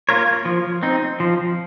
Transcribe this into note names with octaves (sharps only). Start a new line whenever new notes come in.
A#3 F4 A#4 C#5
F3
C4 D#4
F3